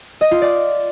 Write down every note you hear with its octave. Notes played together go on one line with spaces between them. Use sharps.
D#5
F4
D5